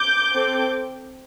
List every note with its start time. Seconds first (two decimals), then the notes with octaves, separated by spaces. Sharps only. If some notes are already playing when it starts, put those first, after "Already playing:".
Already playing: D6 G6
0.33 C4 A4